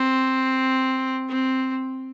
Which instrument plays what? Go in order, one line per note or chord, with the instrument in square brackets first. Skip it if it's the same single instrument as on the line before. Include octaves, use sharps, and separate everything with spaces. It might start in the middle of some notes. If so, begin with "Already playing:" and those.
Already playing: [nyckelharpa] C4
C4